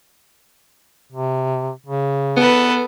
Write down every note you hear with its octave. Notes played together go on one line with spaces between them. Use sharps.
C3
C#3
B3 A4 B4